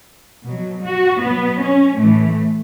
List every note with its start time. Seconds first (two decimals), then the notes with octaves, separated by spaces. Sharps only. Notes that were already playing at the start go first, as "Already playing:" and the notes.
0.46 B2 F#3
0.84 F#4
1.22 B2 F#3 B3
1.61 C#4
1.99 A2 E3 A3